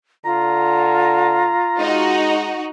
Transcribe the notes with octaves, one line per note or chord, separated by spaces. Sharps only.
D3 F4 A#5
G#3 D#4 F#4